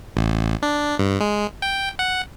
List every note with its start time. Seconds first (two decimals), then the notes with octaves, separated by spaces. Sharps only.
0.17 A1
0.62 D4
0.99 G2
1.20 G#3
1.62 G5
1.99 F#5